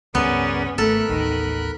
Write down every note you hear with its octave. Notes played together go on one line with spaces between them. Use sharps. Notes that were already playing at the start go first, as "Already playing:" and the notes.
C#2 G2 G3 B3 C#4 G#4 A#4 D5
G#1 A3 A4 A#4 B5 F#6
A1 D#2 D#3